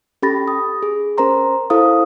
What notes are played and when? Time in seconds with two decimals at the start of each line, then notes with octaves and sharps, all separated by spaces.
0.22 C#4 G4 A4 B5 A6 A#6
0.48 D#6
0.83 G#4
1.18 C#4 A#4 C5 A#5 C6
1.70 E4 A4 C5 F5 D#6